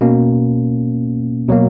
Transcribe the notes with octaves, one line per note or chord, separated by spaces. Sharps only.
B2 A#3 C#4
B2 F#3 A#3